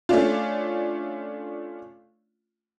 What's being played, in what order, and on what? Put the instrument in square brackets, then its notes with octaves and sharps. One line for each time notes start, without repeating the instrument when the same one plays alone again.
[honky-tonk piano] A3 C#4 D4 F4